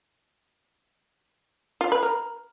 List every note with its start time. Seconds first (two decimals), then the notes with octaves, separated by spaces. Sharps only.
1.81 F4
1.92 B4
2.03 A#4